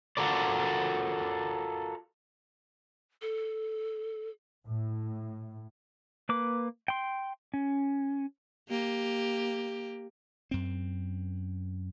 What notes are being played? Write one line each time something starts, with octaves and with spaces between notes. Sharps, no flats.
F4 F#4 A4 A#4 D5
A4
A2
A#3 B4 D6
G5 C6
C#4
A#3 G4
F#2 C4